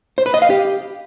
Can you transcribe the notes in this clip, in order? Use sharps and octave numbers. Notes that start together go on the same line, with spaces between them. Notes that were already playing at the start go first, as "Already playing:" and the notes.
C5
B4
D#5
F5
G4